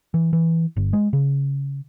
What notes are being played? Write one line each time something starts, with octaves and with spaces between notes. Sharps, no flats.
E3
E3
G1
G#3
C#3